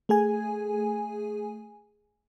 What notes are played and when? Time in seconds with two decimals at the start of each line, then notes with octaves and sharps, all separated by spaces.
0.09 A3 G#4 G#5